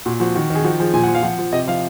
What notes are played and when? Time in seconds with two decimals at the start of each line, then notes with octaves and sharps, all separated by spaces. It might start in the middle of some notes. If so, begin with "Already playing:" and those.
0.05 A#2 F#4
0.20 F3 F#4
0.35 D#3 F#4
0.50 D#3
0.55 G#4
0.64 F3 F#4
0.79 F3 G#4
0.93 A#2 G#5
1.04 F3 F#5
1.15 F5
1.23 F3 F#5
1.38 F3
1.53 C3 D#5
1.68 F3 F5